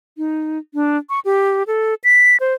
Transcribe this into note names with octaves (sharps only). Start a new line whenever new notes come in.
D#4
D4
C#6
G4
A4
B6
C5